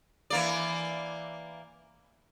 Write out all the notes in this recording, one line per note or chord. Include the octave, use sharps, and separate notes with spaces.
E3 A#3 D5